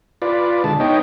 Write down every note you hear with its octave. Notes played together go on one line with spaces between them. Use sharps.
F4 B4 D5
D3 G#3 A5
B3 D#4 C#5 D#5 G5